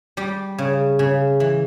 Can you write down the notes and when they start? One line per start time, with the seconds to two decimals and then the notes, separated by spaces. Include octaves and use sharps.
0.17 G3 G4
0.58 C#3
0.99 C#3
1.40 E3